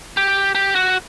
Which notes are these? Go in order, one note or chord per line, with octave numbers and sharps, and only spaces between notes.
G4
G4
F#4